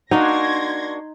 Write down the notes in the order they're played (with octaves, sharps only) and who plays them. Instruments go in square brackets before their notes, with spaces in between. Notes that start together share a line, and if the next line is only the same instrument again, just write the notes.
[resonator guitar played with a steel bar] A#3 D4 F#4 [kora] D#4 [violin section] C6 G#6 A#6